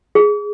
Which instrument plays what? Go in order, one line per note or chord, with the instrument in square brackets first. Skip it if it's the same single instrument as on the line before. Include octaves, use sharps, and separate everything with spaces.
[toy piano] G#4